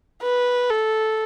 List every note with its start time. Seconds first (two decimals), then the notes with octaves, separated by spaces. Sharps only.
0.23 B4
0.70 A4